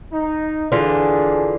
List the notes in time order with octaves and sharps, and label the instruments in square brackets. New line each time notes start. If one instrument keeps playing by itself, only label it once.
[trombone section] D#4
[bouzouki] D3 E3 F4 [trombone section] D4 G#4